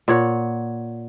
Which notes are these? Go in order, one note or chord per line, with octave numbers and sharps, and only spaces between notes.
A#2 C#5 F#5